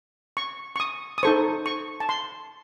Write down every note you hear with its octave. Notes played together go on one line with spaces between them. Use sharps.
C#6
C#6
D#6
D#6
D#4 A4 C5 C#6
C#6
A5
C6